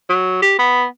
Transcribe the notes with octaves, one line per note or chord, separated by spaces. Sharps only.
F#3
G4
B3